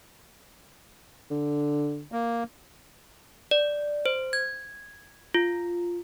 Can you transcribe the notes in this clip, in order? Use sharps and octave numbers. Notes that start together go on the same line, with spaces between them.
D3
A#3
D5
C5
G#6
F4